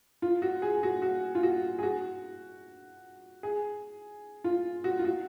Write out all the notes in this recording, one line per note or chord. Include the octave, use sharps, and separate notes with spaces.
F4
F#4
G#4
F#4
F#4
F4
F#4
G#4
F#4
G#4
F4
F#4
F4
F#4